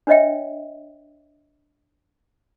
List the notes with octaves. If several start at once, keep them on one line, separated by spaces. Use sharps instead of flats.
D4 B4 C#5 D#5 E5 G5